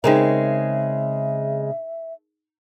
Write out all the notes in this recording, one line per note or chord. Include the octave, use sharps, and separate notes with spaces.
C#3 G#3 C4 D#4 G#4 A#4 E5